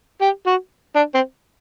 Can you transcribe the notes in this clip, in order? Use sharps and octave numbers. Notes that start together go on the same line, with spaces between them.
G4
F#4
D4
C4